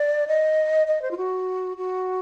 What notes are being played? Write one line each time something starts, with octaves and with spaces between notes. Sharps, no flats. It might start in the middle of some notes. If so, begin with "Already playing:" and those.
Already playing: D5
D#5
D#5
C5
F4
F#4
F#4